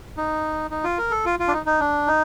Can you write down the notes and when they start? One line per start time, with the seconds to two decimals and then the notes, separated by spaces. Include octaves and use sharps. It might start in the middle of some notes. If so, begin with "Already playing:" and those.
0.17 D#4
0.71 D#4
0.84 F4
0.98 A#4
1.11 A4
1.26 F4
1.40 F4
1.48 D4
1.53 D#4
1.66 D#4
1.80 D4
2.07 D#4